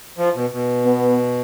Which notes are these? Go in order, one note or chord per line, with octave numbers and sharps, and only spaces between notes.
F3
B2
B2
B3